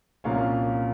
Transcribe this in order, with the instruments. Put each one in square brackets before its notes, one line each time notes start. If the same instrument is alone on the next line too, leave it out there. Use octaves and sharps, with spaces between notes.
[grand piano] C2 A#2 F3 A#3 C#4 F5